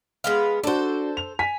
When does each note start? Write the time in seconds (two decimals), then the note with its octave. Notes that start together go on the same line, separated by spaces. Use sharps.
0.24 G#3 B3 F5
0.63 D4 F#4 A4 C5
1.17 F7
1.39 G#5 B6